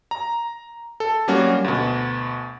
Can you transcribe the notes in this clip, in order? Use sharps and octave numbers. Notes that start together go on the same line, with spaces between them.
A#5
A4
F#3 G3 A#3 C#4 F#4
D2 B2